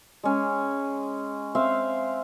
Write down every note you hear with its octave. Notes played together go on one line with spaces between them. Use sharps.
G#3 C#4
C4 E5 F5